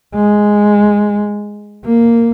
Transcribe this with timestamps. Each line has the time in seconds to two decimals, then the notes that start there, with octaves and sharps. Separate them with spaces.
0.14 G#3
1.85 A#3